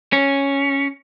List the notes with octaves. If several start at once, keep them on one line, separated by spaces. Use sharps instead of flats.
C#4